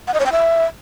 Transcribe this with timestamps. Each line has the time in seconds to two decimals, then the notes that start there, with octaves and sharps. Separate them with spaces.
0.08 F#5
0.14 D#5
0.20 C#5
0.26 G5
0.32 E5